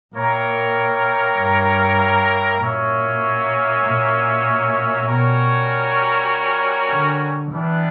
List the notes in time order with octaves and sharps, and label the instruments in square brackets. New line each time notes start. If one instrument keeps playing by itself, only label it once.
[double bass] A#2 [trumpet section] A#3 E4 A#4 C#5 G5
[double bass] G2
[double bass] A#2 [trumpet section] A#3 C#4 F#4 C#5 E5
[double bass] A#2
[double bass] B2 [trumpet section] G3 C#4 F#4 A#4 C#5
[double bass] D3
[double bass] E3 [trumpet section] G3 B3 D4